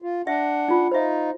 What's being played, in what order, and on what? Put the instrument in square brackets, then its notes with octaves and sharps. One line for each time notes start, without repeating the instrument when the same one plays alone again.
[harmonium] F4
[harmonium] D4 F#5 [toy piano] E5
[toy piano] D#4 F4
[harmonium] D#4 F4 [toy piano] C5 E5